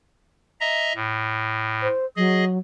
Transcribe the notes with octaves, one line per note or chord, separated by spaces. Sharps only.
D#5 E5 A#5
A2
C5
F#3 G#4 D#5